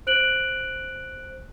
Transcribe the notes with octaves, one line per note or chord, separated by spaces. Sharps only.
C5 F#6 D7 F#7